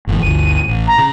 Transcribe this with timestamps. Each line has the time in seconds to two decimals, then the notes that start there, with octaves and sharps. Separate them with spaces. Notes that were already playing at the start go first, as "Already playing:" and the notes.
0.07 G1 F2 E3
0.22 G1 D2 D#7
0.68 A1
0.87 A#5
0.99 C#3